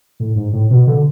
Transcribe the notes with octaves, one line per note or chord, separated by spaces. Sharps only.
A2
G#2
A2
B2
D3